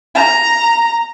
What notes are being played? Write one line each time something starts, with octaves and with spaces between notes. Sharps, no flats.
A#5